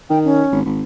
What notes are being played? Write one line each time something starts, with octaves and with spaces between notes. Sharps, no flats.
D#3 G5
C#4
G#1
G#1